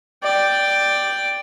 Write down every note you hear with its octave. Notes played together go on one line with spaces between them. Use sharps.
D5 G5